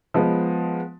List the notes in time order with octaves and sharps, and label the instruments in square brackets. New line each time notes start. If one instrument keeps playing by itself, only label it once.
[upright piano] F3 G#3 B3